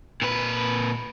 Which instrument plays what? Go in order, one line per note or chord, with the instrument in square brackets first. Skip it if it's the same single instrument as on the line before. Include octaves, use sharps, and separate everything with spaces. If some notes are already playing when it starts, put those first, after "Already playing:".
[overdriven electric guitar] A#2 B4